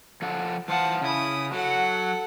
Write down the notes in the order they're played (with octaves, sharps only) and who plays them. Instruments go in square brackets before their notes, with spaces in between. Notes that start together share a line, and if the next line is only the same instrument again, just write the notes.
[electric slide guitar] F3 A4 F#5
[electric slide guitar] E3 C5 F5 [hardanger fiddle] F#5 A5
[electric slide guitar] C#3 [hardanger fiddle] E4 D#6
[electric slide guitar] F#3 [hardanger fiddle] A4 F#5